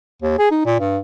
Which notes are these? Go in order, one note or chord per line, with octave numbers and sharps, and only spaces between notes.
D#2
G#4
D#4
A#2
G2